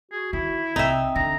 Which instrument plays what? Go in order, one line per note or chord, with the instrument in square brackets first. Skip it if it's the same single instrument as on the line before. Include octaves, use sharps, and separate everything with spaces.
[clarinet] F#4 [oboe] G#4
[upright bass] D#3 [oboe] E4
[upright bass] C2 [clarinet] C4 [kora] D#4 E5
[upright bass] D3 [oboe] A#5